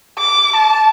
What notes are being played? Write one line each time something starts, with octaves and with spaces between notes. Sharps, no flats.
D6
A5